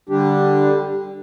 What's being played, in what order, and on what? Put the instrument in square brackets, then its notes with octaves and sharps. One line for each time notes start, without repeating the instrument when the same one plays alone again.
[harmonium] D3 G3 D4 G4